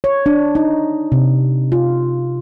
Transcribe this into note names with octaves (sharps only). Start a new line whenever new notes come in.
C#5
D4
D#4
C3
F4